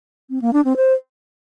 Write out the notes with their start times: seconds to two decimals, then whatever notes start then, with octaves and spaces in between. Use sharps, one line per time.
0.30 C4
0.42 A#3
0.53 D4
0.65 C4
0.76 C5